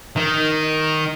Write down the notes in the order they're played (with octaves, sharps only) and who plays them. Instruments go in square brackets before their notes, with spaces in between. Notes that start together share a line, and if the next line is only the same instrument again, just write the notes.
[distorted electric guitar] D#3